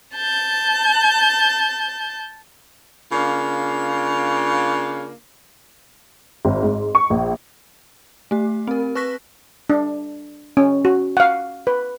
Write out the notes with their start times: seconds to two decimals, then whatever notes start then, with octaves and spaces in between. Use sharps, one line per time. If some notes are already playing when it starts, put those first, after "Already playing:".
0.16 A5 G6
3.12 C#3 A#3 D4 F4
6.45 G#1
6.63 G#2
6.95 C#6
7.10 A#1
8.31 A3 G4
8.67 C4 A#4
8.95 B4 C#6 F#6 A#6 B6
9.70 D4
10.57 C#4
10.85 F#4
11.17 F5 F#5
11.67 B4